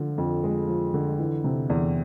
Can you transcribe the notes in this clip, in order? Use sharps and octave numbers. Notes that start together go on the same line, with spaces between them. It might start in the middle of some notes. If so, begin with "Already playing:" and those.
Already playing: D3 F3
F2
G#3
F3
D3
E3
C3
E2